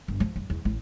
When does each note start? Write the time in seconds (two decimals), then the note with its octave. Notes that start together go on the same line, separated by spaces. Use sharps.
0.08 G1
0.20 F3
0.36 F#2
0.50 E2
0.65 A1